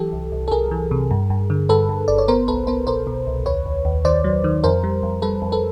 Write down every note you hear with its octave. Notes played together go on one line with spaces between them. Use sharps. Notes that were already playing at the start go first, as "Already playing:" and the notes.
Already playing: E3 F#3 G4 A4
C2
C2
A4
C2 G#4 A#4
E3
C3
G2
G2
D3
G2 A4 B4
G2
G1 D5
C#5
B3 A#4 C5
C2 A4 B4
B3 A#4 C5
B2 A#4 C5
B2
C2
D#2 B4 C#5
D#2
D#2
D#3 C5 D5
F#3
D#3
F2 A#4 C5
G3
F2
G3 A4 B4
F2
A4 B4